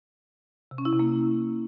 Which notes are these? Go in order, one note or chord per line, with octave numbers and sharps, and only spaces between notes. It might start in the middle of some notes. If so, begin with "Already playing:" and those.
C3
C#4
E4
C3
A#3